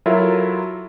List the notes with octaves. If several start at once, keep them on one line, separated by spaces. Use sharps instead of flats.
F#3 E4 F4 A4 A#4 E5